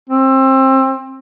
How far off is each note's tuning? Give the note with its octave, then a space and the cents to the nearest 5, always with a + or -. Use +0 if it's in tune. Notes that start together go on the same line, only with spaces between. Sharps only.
C4 +25